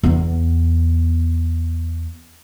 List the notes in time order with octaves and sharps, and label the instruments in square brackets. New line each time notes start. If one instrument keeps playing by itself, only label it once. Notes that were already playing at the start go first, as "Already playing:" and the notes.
[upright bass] E2 B3